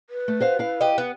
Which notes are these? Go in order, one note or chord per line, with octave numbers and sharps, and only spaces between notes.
B4
A3
F#4 C5 F5
E4 F5
G4 D#5
B3